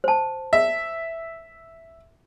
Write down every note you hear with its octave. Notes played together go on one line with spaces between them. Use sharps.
C5 A5
E5